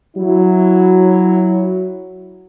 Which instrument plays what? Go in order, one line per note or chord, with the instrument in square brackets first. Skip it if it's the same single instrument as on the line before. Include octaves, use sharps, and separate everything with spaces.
[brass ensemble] F#3 E4